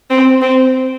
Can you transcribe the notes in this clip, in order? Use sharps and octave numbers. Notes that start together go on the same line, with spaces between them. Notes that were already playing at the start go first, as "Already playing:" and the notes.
C4
C4